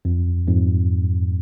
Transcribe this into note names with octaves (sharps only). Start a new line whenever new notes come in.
F2
F2 G#2